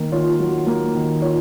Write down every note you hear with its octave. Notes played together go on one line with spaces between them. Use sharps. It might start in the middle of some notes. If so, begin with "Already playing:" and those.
Already playing: D#3 A#3
F4 C#5
F#3
A#3
D#3
F4 C#5